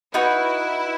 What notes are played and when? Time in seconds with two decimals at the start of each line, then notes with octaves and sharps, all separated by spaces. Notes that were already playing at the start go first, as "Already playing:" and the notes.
0.13 D#4 E4 F#4 B4